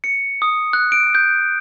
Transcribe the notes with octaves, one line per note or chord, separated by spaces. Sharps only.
C#7
D#6
F#6
D7
G6